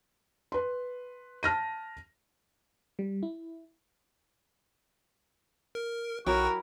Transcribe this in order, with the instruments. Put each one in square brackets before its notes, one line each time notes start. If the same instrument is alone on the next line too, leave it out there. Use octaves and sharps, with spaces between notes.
[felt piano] B4 C6
A5 F6 A#6 D#7
[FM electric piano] G3
E4
[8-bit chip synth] A#4
[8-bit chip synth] B1 G5 C#6 [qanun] F#3 E4 G4 [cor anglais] F#4 [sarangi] A#4